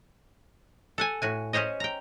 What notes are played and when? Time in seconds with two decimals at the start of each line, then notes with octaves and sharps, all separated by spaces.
0.98 A4 F#5 G#5
1.22 A2 F#4 G#5
1.53 C#4 G#4 C5 C#5 D#5
1.80 G5 A#5